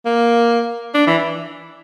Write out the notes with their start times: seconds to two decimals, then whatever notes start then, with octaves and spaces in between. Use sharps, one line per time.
0.05 A#3
0.94 D4
1.07 E3